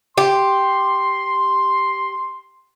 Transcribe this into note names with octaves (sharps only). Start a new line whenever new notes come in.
G4 C6